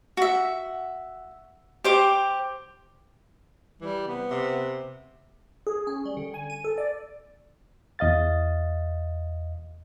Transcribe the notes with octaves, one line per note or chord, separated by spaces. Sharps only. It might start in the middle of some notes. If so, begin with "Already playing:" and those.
F#4 E5
G4 C5 D6
E3 G3
C3 B3
C3
G#4
C#4
G3
D3
G#5
D#7
A4
D5
E2 D#5 F5 A6